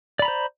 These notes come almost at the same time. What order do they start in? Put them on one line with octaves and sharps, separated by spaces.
D5 B5 A#5 C5